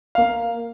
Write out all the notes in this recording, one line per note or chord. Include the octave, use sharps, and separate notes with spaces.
A#3 F5